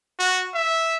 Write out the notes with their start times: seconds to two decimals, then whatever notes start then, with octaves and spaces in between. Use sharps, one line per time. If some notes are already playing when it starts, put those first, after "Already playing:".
0.19 F#4
0.54 E5